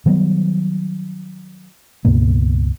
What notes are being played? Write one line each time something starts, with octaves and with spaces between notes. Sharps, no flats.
D#3 F#3 G3 B3
C#2 G2 B2 A#3